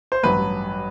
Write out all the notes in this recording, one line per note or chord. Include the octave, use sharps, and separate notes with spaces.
C5
A1 G2 F#3 B4